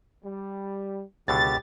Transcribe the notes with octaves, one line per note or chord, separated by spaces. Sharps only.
G3
C#2 F#2 B2 D3 D#3 G4 A6